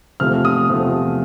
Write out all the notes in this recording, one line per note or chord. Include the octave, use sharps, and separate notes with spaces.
E2 C3 F3 A3 F6
D#6
E2 C3 F3 A3